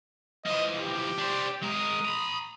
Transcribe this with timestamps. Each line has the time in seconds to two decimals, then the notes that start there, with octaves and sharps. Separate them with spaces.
0.45 E3 F3 D#5
0.79 G4
1.18 D4 C5
1.63 G#3 A#4 D#6
2.05 A#5 B5